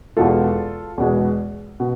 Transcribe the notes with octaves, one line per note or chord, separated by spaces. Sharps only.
E2 B2 G#3 F4 A4
E2 B2 G#3
B2